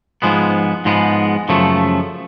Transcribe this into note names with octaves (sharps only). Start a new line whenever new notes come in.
G#2 F3 G#3 B3
G#2 F3 G#3 B3
F#2 C#3 F3 A3